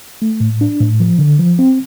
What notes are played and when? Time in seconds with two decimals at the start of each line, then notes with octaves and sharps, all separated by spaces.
0.22 A3
0.40 A2
0.61 D4
0.81 A2
1.00 F3
1.19 D3
1.39 F3
1.59 C4